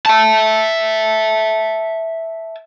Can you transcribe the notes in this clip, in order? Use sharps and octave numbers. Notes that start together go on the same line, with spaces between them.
E5 A5